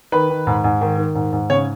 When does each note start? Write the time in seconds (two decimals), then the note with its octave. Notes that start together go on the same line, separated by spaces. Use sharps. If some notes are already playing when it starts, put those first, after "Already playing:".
0.12 D#3 B4
0.30 D#3
0.47 G#2
0.64 G#2
0.81 D#3
0.98 D#3
1.15 G#2
1.32 G#2
1.50 C#3 C#5